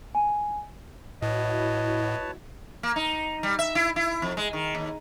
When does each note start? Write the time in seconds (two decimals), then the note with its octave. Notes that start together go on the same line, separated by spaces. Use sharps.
0.15 G#5
1.22 A2 E4 F#4 B4 C#5 D#5 A5
2.83 A#3
2.96 D#4
3.43 G3
3.59 E5
3.75 E4
3.96 E4
4.22 F2
4.37 G#3
4.53 D#3
4.75 D#2